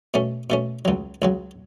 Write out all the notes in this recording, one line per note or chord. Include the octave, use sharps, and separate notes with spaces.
B2 A3 C#4
B2 A3 C#4
C#2 C#3 F#3
C#2 C#3 F#3